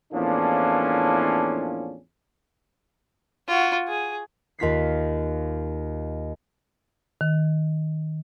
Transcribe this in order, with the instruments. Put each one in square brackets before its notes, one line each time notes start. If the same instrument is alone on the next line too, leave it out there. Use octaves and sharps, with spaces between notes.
[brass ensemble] E2 A2 F3 A#3 C#4 D4
[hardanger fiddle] F4 F#4
G#4
[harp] D#2 F4 B6 C7
[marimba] D#3